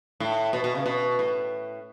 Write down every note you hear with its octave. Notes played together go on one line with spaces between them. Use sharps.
A2
B2
B2
C#3
B2
A2